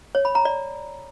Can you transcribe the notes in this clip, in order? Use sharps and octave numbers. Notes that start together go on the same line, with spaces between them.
C#5
B5
A#5
D5